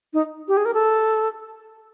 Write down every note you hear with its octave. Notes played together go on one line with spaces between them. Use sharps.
D#4
G4
G#4
A#4
A4